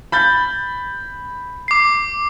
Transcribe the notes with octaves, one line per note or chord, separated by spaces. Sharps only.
B5 G6 A6
D6 C7